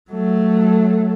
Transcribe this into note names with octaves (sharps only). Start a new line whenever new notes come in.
F#3 A3